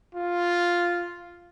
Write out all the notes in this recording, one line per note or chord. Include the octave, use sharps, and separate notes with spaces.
F4